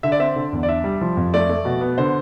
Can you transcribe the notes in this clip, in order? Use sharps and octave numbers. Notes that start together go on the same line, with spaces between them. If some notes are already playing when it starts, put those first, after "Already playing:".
D3 E5
D5
C4 E5
D3
E2
D5
D4 E5
G3
F3
F2
A3 D5
A3
B2
B3
D3 C5